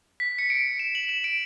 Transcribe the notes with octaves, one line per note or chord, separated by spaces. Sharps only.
B6
C#7
D7
E7
F#7
E7
D7